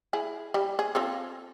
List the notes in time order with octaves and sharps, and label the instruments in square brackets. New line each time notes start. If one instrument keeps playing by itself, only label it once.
[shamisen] E4 G#4
G3
G#4
C4 F4 A4